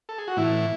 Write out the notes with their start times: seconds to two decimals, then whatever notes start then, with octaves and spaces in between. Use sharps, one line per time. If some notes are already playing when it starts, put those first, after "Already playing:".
0.09 A4
0.18 G#4
0.28 F#4
0.37 A2 E3 E4